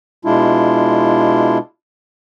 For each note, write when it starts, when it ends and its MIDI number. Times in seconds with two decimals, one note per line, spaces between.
0.25 1.58 47
0.25 1.58 56
0.25 1.58 62
0.25 1.58 64
0.25 1.58 65